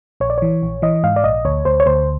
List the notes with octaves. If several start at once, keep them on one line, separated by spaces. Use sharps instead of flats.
A#1 C#5
D5
E3 C#5
A#1
E3 D#5
G#2 F5
D5
A#1 D#5
D2 C#5
D2 C5
C#5
D2 C5